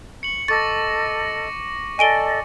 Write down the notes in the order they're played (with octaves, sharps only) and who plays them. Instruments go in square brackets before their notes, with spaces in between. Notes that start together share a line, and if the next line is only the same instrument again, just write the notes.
[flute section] C#6 [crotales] C#7 F#7
[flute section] A4 D#5 [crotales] C#6 D6 A#6 [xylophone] A6
[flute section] A4 D5 D#5 [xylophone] G#5 D7 G7